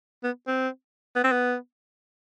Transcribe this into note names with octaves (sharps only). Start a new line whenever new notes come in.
B3
C4
B3
C4
B3